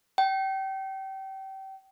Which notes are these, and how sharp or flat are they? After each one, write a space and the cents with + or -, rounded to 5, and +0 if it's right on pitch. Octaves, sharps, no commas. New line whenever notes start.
G5 -30